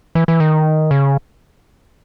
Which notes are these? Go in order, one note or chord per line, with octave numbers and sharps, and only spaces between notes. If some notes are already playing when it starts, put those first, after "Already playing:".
E3
E3
D#3
C#3